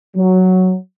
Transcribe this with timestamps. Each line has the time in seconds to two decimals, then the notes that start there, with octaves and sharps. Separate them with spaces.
0.17 F#3